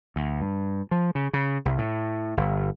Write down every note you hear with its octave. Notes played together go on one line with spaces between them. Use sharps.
D2
G2
F3
C#3
C#3
C2
A2
G1